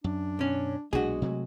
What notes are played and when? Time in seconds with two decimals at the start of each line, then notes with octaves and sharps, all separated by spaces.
0.04 F#2 D4
0.39 B1 C#4
0.93 B1 A#2 G#3 D4 F#4 G#4
1.22 C3 F#3 A3